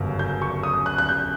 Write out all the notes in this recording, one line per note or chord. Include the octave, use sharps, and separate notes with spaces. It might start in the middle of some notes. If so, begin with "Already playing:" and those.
Already playing: G1 F#2 C#3
G6
C#6
D#6
F#6
F#6
G6